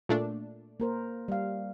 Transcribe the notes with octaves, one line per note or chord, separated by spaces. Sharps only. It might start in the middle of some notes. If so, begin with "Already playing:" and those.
A#2 A3 D4
A#3 A#4 C5
G3 F5